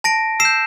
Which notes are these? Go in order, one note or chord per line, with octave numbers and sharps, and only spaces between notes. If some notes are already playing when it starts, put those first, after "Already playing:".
A5 A#6 D7
E6 C7 E7
G6